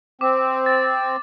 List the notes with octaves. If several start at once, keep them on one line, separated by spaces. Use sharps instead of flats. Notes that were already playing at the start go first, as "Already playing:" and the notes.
C4 D6
A6